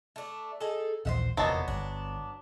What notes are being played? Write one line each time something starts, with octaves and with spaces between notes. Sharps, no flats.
A3 D4
D#4 G#4 A4
A#1 D#2 E3 C5 E5 F#5
F1 E2 A#2 F#3 B3 C5 D#5 A5
G1 D4